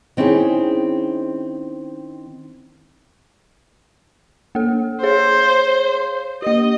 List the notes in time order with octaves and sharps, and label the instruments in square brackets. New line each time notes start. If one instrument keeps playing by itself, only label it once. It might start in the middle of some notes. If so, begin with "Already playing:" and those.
[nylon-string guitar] D#3 C4 C#4 E4 G#4
[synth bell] A#3 A4
[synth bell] G#4 C#5 F5 [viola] C5
[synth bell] A#3 G4 [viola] D#5